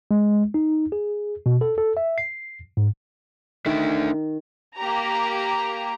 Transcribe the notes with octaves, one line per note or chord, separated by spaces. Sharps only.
G#3
D#4
G#4
B2
A4
A4
E5
C7
G#2
D#3 A3 D4 E5
A#3 G4 A#5